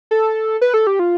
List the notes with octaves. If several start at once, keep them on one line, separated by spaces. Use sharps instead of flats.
A4
B4
A4
G4
F4